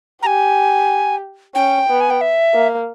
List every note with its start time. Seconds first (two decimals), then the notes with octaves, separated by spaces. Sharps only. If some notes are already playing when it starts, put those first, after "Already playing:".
0.23 G4 G#5 A#5
1.55 C#4 G5
1.89 B3
2.01 G#5
2.10 G5
2.21 E5
2.54 A#3